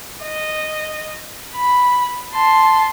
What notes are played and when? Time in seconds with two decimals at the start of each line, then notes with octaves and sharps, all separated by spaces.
0.23 D#5
1.55 B5
2.33 A5 C6